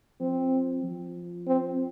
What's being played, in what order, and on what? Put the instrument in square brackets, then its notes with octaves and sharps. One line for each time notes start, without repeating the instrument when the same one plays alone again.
[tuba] F3 [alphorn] C4
[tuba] F3
[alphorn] C4